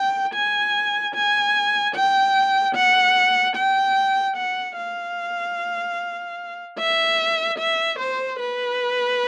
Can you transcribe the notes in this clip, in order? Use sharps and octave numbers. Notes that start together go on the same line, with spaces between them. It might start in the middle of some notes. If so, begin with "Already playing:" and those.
Already playing: G5
G#5
G#5
G5
F#5
G5
F#5
F5
E5
E5
C5
B4